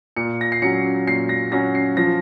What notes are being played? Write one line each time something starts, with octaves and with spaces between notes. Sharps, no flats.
A#2 C#7
A#6
C7
F#3 C#4 C#7
A#2 C7
A#6
F#3 C#4 A#6
C7
F3 A#6